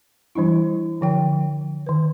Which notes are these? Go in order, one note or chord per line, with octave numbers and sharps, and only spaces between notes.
E3 G3 D4 E4
D3 F3 G5
D#3 B4